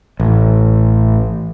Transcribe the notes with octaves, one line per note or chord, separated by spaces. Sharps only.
A1